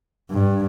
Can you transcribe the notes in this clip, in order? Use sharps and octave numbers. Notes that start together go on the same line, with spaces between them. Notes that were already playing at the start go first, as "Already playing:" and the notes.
G2